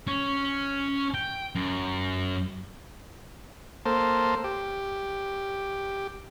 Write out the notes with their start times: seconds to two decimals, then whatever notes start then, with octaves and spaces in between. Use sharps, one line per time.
0.07 C#4
1.14 G5
1.55 F#2
3.85 A#3 A4 C5
4.44 G4